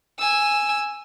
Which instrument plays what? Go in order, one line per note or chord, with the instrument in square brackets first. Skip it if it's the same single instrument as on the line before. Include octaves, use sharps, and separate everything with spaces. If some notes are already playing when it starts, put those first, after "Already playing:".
[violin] G#5 E6